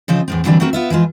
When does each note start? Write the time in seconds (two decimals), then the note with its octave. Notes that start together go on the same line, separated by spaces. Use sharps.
0.08 C#3 F3 C4 D#5
0.28 E2 A2 C4
0.45 D3 E3 F#3 G3 C4 D5
0.60 A3 B3 C4 F#4 A#4
0.73 B3 F4 E5
0.90 E3 F3 G#3 F4